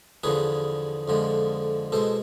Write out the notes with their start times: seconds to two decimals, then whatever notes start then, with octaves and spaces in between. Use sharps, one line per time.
0.23 E2 D3 F3 G#4 B4
1.08 F2 D3 F3 G#3
1.92 B2 G#3 A4 C5